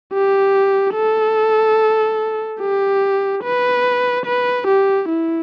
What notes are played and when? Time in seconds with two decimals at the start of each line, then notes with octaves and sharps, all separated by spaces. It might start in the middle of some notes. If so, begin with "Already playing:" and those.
0.13 G4
0.96 A4
2.61 G4
3.44 B4
4.26 B4
4.67 G4
5.09 E4